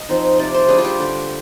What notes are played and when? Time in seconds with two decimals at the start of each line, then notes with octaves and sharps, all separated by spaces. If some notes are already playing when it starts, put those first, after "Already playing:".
Already playing: D#5
0.09 F3 C4 D#4
0.39 C3 D5
0.54 C5
0.69 G3 D4 G#4
0.78 F4
0.85 G4
0.99 D3 G4